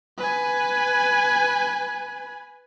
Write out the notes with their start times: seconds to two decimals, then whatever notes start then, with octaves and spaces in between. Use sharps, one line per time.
0.18 B4 G#5